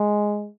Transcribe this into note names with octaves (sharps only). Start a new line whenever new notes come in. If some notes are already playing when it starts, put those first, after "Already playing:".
Already playing: G#3